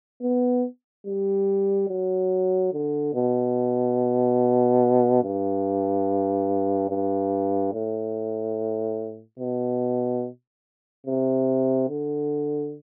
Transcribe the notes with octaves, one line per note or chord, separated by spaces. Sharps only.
B3
G3
F#3
D3
B2
G2
G2
A2
B2
C3
D3